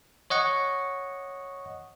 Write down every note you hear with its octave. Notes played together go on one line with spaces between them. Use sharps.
C#5 D#5 F#5 C#6